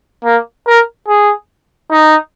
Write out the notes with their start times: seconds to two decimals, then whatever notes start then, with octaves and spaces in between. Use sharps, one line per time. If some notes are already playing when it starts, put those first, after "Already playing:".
0.24 A#3
0.67 A#4
1.07 G#4
1.90 D#4